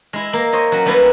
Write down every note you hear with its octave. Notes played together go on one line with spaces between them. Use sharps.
G#3 E4
A#3
C5 C#5 D#5
F#3 C#4
G3 A#3 B3 E4 B4